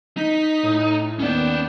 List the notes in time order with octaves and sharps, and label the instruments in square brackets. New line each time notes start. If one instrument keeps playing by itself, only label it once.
[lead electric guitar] D#4 [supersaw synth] B6
[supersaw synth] A2
[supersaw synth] D#2 B3 G5 [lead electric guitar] C#4 D5